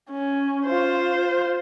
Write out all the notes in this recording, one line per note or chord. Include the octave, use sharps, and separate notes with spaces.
C#4
F4 C5